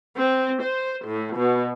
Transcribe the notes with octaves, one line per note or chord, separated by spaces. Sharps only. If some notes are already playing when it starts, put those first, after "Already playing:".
C4
C5
A2
B2